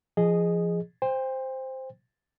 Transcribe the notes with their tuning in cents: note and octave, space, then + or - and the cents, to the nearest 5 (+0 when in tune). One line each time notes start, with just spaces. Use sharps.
F3 -20 G#4 +0 D#5 -10
C5 +0 G5 +35